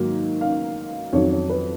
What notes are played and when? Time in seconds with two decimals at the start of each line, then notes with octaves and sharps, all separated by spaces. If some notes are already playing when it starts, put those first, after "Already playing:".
Already playing: G#2 D#3 F#3 A#3
0.41 F5
1.13 F2 D#3 F#3 C#5
1.31 C#5
1.49 B4